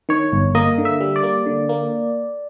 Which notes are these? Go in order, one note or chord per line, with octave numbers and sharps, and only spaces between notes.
D#3 C#5
G1
A#3 D#5
D3
E5
G3
D5
A#3
D3
A#3